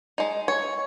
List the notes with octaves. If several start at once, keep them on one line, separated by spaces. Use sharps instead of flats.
G#3 D#4
C#5